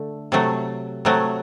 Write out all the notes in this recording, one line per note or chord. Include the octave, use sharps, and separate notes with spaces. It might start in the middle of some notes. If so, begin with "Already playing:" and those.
Already playing: D3 A3
C3 F#3 A3
C3 F#3 A3